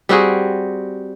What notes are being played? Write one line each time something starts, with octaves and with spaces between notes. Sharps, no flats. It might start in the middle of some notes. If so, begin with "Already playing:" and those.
G3 C4 F#4 G#4